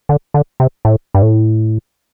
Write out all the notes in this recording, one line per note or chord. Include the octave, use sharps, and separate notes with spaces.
D3
D3
C3
A2
G2
A2